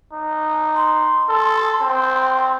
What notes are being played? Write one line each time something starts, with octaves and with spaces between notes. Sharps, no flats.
D#4
C6
A4
C4